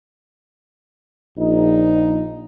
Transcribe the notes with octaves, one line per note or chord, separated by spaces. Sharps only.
A#1 D#4